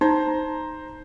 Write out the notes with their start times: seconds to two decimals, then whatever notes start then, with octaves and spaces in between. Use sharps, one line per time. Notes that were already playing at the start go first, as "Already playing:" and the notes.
0.01 D#4 C5 A#5